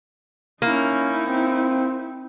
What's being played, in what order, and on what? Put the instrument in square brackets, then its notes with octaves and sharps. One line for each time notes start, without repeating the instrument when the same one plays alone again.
[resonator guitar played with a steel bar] A#3 [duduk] C#4 [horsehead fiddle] D#4 E4
[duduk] C4